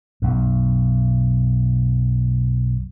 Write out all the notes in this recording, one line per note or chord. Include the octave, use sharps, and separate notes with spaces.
B1 F#2